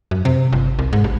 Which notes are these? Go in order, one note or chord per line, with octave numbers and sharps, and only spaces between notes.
F#2
C3
G1
C2
G#2
A1